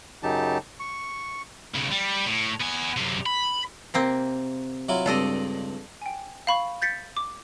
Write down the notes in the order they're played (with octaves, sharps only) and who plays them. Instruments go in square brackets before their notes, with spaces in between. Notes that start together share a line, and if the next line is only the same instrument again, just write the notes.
[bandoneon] F#2 C#3 F#3 D#4 G4 A5
C#6
[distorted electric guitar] B1 C#3
G3
A2
B3 G#5
F#2 C3
B5
[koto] C3 A#3 C4
[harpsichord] F#3 E4 F4
[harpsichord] C#2 G2 C4 [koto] D4 A4 D#5
[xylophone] G5 G#5
F5 B5 C#6
G6 A6 B6 C#7
D6